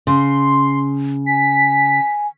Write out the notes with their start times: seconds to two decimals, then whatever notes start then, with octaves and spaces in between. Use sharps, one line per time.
0.07 C#3 C6
1.26 G#5 B6